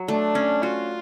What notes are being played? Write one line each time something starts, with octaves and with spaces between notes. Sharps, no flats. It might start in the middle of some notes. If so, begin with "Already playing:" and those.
Already playing: F#3
A3 D4
C#4
F4 F#4